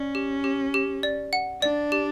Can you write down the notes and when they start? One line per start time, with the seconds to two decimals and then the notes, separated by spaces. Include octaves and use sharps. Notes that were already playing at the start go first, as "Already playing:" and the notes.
Already playing: C#4 D5
0.15 G4
0.44 G4
0.74 G4
1.03 D5
1.33 F#5
1.62 D4 D5
1.92 G4